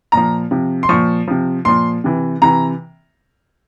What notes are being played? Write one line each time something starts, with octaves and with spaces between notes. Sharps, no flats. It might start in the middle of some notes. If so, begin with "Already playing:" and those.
A#2 F3 A#5
C3 F3
C6
A#2 F3 C#6
C3 F3
A#2 F3 C6
C3 E3
C3 E3 A#5